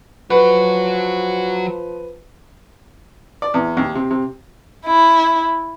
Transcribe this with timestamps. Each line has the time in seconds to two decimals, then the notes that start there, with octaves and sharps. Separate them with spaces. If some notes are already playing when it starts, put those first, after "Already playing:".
0.30 F3 F#3 F#4 B4
3.42 D5
3.54 E2
3.77 D#2
3.95 C3
4.11 C3
4.86 E4